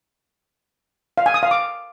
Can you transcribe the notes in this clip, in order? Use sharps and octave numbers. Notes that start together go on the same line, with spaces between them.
F5
G#5
D#6
F5
D6